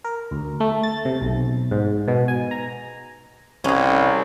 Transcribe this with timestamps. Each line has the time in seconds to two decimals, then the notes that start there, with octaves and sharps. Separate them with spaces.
0.04 A#4
0.31 D2
0.60 A3
0.83 A6
1.05 C3
1.21 B1
1.71 G#2
2.08 B2
2.28 G#5
2.51 A#5
3.64 C2 C#4 G#4